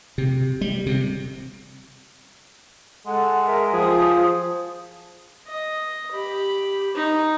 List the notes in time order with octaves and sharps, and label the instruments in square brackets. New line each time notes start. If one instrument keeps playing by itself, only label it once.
[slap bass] C3
G3
C3
[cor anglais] G#3 [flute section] A4 F#5
[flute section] G#4 A#4 E5
[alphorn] F3 [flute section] G4 D#6 [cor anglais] G#4
[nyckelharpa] D#5
G4 B5
D#4